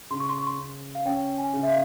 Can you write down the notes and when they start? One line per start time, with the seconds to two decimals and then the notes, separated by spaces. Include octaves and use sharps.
0.10 C#3 C6
0.20 C#6
0.29 C6
0.38 C#6
0.47 C6
0.59 C#4
0.95 F5
1.05 C#4 G5
1.38 G#5
1.53 C#3
1.63 E5
1.69 F5